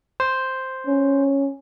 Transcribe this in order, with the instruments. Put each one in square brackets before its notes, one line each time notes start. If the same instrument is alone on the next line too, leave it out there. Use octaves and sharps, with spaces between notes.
[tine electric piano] C5
[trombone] C#4